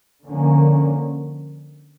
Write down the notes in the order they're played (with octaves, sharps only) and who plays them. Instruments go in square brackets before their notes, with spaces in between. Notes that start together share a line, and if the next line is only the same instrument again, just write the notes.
[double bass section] D3 F3 A#3 C#4